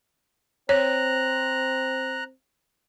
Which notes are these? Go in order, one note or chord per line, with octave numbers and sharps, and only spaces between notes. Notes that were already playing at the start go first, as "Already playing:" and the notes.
C4 C#5 A#5 F#6